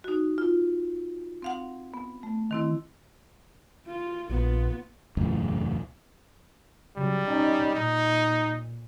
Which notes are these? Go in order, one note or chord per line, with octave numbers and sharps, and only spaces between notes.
D#4 F#4
F4
C4 F5 F#5
B3
A3
D#3 C4 E4
F4
A#1 B3 F4
E1 C#2 F#2 A2
C#3 F#3 G3
C#4 D#4
A#2 D#4